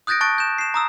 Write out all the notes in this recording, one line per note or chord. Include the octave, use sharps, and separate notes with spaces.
D#6 F#6 G6 A6 A#6 D7
A5 C#6 F#6 A6 D7
G6 E7
C7 E7
A#5 D#6 E6